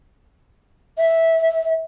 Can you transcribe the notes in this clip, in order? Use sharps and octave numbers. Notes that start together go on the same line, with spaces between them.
E5